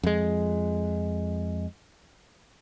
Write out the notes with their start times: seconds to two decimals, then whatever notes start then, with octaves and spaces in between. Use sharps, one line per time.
0.03 F2 G#3